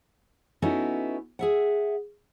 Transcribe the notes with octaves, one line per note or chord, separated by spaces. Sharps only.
B3 C#4 D#4 E4 F#4 A4
G#4 E5 F#5